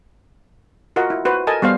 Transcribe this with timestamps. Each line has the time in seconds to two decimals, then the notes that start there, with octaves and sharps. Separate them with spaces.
0.96 F4 F#4 A#4 D#5 F#5
1.10 E4
1.25 F#4 B4 C5
1.47 A4 A#4 D#5 G#5 A5
1.62 G3 B3 C5 F5